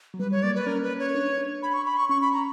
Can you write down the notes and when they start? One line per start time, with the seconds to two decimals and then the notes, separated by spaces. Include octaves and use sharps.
0.14 F#3
0.19 G3 B4
0.31 C#5
0.43 A#3 D5
0.56 B4
0.66 C#4 A#4
0.83 B4
0.99 C#5
1.15 D4
1.38 D4
1.62 B5
1.73 C#6
1.86 B5
1.97 C#6
2.09 C#4 C#6
2.21 B5
2.33 A#5